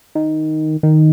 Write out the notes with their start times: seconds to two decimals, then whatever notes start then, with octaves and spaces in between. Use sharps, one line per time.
0.15 D#3
0.83 D#3